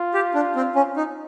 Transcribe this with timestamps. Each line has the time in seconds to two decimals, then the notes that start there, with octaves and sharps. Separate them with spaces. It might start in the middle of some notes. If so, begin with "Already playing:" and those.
Already playing: F4
0.14 G4
0.34 D4
0.56 C4
0.75 C#4
0.97 D#4